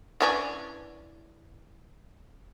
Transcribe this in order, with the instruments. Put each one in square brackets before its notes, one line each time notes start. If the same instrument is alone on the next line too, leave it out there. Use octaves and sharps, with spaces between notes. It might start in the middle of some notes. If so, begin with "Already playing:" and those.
[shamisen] E3 C#4 D4